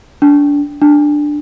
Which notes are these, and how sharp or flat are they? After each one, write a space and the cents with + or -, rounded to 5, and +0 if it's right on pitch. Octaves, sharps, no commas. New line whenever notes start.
D4 -25
D4 +5